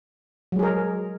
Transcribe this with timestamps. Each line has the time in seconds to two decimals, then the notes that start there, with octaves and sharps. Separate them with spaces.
0.52 F#3
0.56 G#3
0.59 G#4
0.63 A#4